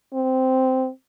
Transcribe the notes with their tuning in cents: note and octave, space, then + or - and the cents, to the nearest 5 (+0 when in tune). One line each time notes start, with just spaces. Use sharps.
C4 -10